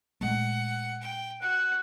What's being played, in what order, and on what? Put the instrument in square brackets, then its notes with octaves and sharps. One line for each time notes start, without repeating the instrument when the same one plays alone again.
[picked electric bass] A#2 G#3 A3 [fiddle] F#5
[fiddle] G5
[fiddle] F#4 [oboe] F#5